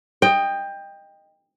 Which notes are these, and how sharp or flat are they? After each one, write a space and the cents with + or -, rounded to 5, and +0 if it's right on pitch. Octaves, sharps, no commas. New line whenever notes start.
D#5 -5 G5 +20